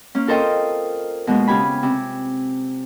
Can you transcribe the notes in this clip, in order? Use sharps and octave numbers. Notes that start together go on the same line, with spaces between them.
A#3 C#4
F4 A4 A#4 C5 D#5 G5
B2 G#3 A#3 B3
C#3 G4 G#5 B5
C3